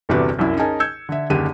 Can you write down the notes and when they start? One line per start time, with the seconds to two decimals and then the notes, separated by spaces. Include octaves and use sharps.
0.09 G1 E2 C3 D4 F#4 B4
0.39 C2 F#2 E4
0.57 C#4 D#4 G#4 A#4 G#5 A5
0.80 E6 G6 G#6 C#7
1.09 D3 E5
1.30 F#1 D#2 D3 D4 G4 D#7